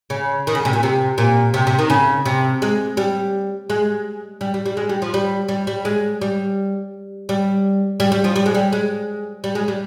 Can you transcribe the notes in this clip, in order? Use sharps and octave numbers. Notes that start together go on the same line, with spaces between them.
C#3
D#3
C#3
C3
A#2
C3
A#2
C3
C3
D#3
C#3
C3
G#3
G3
G#3
G3
G3
G3
G#3
G3
F3
G3
G3
G3
G#3
G3
G3
G3
G3
F3
G3
G#3
G3
G#3
G3
G#3
G3